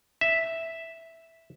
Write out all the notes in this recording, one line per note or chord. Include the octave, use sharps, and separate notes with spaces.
E5